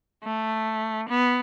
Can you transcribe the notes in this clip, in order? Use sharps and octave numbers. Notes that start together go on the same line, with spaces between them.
A3
B3